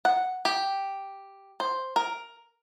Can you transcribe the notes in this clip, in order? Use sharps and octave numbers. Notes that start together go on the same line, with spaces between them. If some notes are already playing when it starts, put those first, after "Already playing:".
F#5
G4
C5
A#4